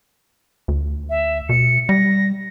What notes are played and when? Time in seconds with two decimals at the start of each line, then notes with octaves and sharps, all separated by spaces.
0.68 D2
1.10 E5
1.49 B2 C#7
1.89 G3 A#6